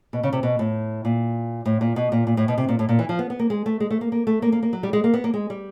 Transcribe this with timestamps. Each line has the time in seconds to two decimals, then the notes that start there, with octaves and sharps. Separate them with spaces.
0.13 B2
0.23 C#3
0.33 C3
0.43 B2
0.59 A2
1.05 A#2
1.66 A2
1.81 A#2
1.96 B2
2.12 A#2
2.27 A#2
2.37 A2
2.48 B2
2.58 C3
2.69 A#2
2.79 A2
2.89 A#2
2.99 E3
3.09 F3
3.19 B3
3.30 B3
3.39 A#3
3.50 G#3
3.66 A3
3.80 G#3
3.91 A3
4.01 A#3
4.12 A#3
4.27 A3
4.42 A#3
4.52 A#3
4.63 A#3
4.73 F#3
4.83 G3
4.93 G#3
5.04 A#3
5.14 B3
5.24 A#3
5.34 G#3
5.50 G3